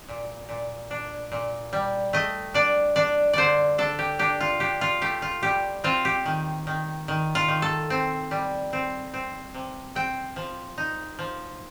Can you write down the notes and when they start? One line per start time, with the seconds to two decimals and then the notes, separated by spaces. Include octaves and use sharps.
0.09 A#2
0.49 A#2
0.91 D4
1.32 A#2
1.73 G3
2.13 A3 D#5
2.54 D4 D5
2.96 D4 D5
3.33 D3 C5 D5
3.78 D4 A4
3.99 G4
4.19 D4 G4
4.40 F4
4.60 D4 G4
4.81 F4
5.02 A3 G4
5.22 F4
5.43 G3 G4
5.84 C4 F4
6.05 G4
6.26 D#3
6.67 D#3
7.08 D#3
7.35 F4
7.48 D#3
7.62 A4
7.90 C4
8.31 G3
8.73 C4
9.14 C4
9.54 C3
9.95 C4 G5
10.36 F3
10.78 D#4
11.19 F3